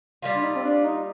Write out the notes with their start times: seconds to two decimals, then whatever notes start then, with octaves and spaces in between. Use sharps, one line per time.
0.22 G3 A#3 F4
0.35 D4
0.43 D#4
0.56 C4
0.64 D4
0.84 D#4